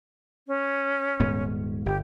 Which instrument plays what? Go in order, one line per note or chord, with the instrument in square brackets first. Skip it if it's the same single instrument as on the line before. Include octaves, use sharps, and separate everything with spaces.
[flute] C#4
[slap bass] D#1 G#2 B3
[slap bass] G1 [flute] G4